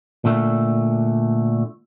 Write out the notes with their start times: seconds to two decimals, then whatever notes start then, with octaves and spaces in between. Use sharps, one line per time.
0.25 A#2 D3 A3